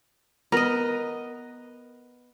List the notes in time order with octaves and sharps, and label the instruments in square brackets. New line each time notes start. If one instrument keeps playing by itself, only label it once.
[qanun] B3 D#5 [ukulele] A#4